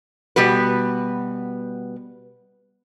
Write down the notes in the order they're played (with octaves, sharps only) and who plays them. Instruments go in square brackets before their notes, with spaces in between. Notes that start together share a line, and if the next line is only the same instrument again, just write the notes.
[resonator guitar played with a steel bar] B2 G3 B3 F#4 B4